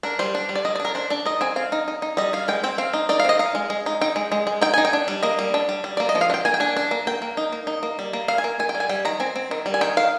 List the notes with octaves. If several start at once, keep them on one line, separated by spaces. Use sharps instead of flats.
D4 A#4
G3 C5
D4
G3
D5
G3 D#5
D5
D4
A#4
D4 C5
D4 D5
D#4 D#5
C4 G#5
C4 F5
D#4
D#4
D#4
G3 D#5
G3 F5
G#3 G5
C4 G5
C4 F5
D#4
D#4 D5
F5
C4 D#5
D#4 F5
G#3
G#3
D#4
D#4 G5
G#3
G#3
G#3
D#4 G5
D#4 G#5
G5
D4
G3
A#3 D#5
G3
D4
G3
G3
A#3 D5
D#5
F3
F5
D4
G5
A#3 G#5
G5
D4 G#5
D4
A#3
A#3 G5
A#3
D#4
A#3
D#4
A#3
G3
A#3
A#3 F5
G#5
A#3
D#3 G#5
G5
G3
G#5
G3 G5
D#3 A#5
C4 G#5
C4
D#3
G3
G#5
D#3 G5
D#3 F5